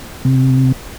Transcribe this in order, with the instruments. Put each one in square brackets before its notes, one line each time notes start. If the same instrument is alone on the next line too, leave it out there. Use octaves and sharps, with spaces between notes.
[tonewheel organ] C3